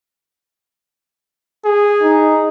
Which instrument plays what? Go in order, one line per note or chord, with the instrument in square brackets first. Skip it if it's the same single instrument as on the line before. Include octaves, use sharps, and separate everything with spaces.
[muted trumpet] G#4
[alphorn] D#4